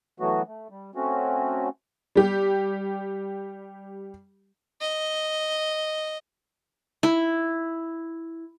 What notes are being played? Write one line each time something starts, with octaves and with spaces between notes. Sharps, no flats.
E3 F#3 A3 B3 F#4
A3
G3
A3 C4 C#4 F#4
G3 G4
D#5
E4